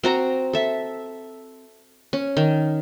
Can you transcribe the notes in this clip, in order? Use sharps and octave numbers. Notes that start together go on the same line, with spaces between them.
C4 F#4 A#5
A4 E5
C#4
D#3